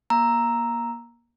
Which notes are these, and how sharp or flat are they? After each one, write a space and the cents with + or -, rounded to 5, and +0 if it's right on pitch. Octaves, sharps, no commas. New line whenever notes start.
A#3 +30 A#5 +0 E6 +0